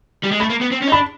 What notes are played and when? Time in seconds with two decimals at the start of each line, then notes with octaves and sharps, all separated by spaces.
0.23 G3
0.31 G#3
0.40 A3 B5
0.50 A#3
0.61 B3
0.71 C4
0.82 C#4
0.88 D#4
0.92 D4 B5